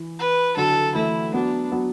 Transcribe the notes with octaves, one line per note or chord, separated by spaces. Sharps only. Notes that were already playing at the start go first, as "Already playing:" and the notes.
Already playing: E3
B4
D3 F#3 A4
E3 A3 E4
F#3 B3 D4
F#3 B3